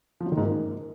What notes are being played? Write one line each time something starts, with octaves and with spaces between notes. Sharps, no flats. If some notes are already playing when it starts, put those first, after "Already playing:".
F3
F#3
D#3
G#2
A#3